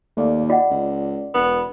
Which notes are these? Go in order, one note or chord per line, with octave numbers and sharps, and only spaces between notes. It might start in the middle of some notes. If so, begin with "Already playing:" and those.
D#2 A3 D5 F5
F4 D5 D#5 F#5
C#2
E1 B3